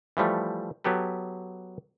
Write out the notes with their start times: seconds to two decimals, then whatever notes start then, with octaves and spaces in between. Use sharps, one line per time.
0.17 E3 F3 G3 A3
0.84 F#3 B3 G4 A4 B4